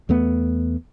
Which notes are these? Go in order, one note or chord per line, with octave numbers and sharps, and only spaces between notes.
E2 A3 B3